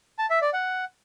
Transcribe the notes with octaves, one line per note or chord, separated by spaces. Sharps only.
A5
E5
D5
F#5